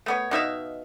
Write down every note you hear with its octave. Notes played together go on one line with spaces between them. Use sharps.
A3 B3 C#5
B2 D#4 E5 F5